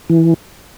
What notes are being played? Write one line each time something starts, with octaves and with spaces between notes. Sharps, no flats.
E3